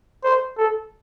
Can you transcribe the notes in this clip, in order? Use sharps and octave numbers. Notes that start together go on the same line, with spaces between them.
C5
A4